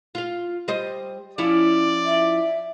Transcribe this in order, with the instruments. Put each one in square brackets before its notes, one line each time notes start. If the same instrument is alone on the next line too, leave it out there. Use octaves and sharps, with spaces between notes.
[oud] F4 F5
G3 C5 D#5
[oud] F3 C#4 E4 [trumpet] D5
[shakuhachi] E5